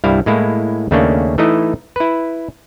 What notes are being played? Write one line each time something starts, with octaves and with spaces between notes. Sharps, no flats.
C2 G2 G3 E4 F5
A2 G#3 A#3 E4
D#2 C#3 A3 A#3 C#4 D4
E3 A3 D#4 E4 D#5
E4 B4